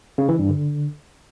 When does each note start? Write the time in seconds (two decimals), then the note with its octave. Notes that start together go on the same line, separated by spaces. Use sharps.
0.18 C#3
0.29 E3
0.39 G2
0.49 D3